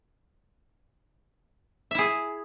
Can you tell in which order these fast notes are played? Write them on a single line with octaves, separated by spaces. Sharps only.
E5 E4 G#4